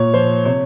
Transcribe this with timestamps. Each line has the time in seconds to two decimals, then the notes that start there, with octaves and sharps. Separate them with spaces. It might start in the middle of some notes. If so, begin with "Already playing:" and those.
Already playing: A#2 C#5
0.14 F3 C5
0.45 C3 C#5